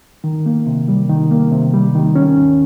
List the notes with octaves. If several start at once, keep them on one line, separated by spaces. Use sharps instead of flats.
D#3
A#3
C3
G3
D#3
A#3
C3
G3
D#3
C#4
D#2